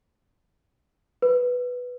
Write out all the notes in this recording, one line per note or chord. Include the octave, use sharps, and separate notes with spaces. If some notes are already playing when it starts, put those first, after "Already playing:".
B4